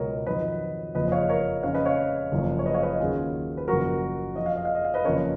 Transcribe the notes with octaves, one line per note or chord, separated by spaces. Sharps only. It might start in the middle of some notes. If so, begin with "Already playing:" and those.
Already playing: C#2 B2 F#3 A#4 C#5 D#5
F2 D#3 F#3 B4 D#5
F#1 F2 F3 B4 D#5
D#5
C#5 F5
A#4 C#5
F2 C#3 F3 C#5 F5
B4 D#5
C#5 F5
F#1 F#2 F3
C#5
B4 D#5
C#5 F5
B4 D#5
D#2 C#3 F#3 F4 G#4
B4
F#1 F#2 F3 F#4 A#4
F2 F3 D#5
F5
D#5
F5
D#5
F5
B4 D#5
F#1 F2 C#3 A#4 C#5